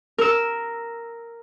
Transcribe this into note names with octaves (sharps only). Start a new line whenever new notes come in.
A#4 E6